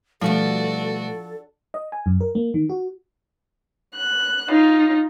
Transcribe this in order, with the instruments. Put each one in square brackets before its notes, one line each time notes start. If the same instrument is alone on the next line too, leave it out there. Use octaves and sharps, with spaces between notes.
[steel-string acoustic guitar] B2 G3 A3 [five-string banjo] F3 [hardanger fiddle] D4 F#4 [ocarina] A4
[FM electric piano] D#5
G#5
F#2
A#4
A#3
D#3
F#4
[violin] F#6
D#4 F4